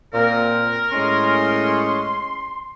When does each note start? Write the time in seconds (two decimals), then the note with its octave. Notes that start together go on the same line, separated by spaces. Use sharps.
0.14 A#2 C4 A#4
0.92 A2 G#3 C#4 C6